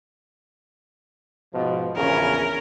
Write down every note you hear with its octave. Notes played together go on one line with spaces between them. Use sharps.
G#2 B2 F3
A#1 E2 C#3 C#4 A#4